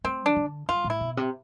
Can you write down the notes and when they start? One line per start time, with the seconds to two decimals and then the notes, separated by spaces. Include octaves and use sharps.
0.04 A3 C4
0.26 D4
0.32 C3
0.36 D3
0.68 G2 F4
0.84 A2
0.90 E4
1.01 B2
1.17 C3